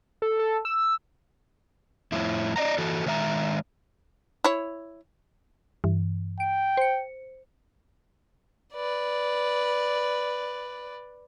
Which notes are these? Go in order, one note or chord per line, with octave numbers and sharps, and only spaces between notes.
A4
A4
E6
F2 A2 E4
D5 D#5 F#5 A#5
E3 F#4 A4
D#3 G#3 E5 A#5
E4 C#5
G2 E3
G5 D7
C5 C#7
B4 D5